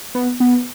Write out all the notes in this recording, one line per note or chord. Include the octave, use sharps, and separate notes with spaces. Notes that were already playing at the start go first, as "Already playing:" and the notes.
B3
B3